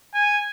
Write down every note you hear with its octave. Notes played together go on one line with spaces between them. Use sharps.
G#5